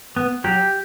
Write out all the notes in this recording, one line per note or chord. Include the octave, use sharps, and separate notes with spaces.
B3
F#3 G4